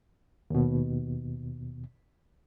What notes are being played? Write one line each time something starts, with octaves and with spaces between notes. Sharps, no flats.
D#2 B2